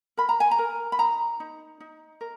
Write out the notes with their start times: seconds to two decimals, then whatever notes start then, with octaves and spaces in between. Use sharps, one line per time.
0.17 A#4 B5
0.29 A#5
0.40 G#5
0.51 A#5
0.59 A#4
0.92 B5
0.98 D#4 A#5
1.40 D#4
1.80 D#4
2.21 A#4